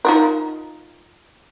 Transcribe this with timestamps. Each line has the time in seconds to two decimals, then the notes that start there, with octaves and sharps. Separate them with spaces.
0.05 D#4 F4 A#4